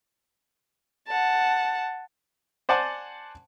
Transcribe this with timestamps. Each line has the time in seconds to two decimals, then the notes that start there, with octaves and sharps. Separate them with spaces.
1.08 F#5 A5
2.69 C5 D5 F#5 G#5 A5